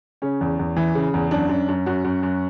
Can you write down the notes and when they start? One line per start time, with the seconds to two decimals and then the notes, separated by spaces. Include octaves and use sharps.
0.22 C#3 C#4
0.41 E2
0.59 E2
0.76 E3
0.95 C#3
1.14 E2
1.31 F#2 D4
1.49 F#2
1.69 F#2
1.86 F#2 F#4
2.05 F#2
2.23 F#2